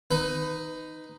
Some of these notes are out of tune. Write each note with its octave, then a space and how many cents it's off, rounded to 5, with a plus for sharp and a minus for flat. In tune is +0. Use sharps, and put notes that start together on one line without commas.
D#4 +0 B4 +25